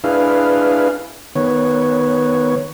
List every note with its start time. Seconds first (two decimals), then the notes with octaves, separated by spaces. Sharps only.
0.04 D4 E4 G#4 B4 F5
1.36 D#3 B3 C#5